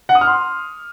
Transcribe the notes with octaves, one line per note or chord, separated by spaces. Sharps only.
F#5
D#6
F6
C6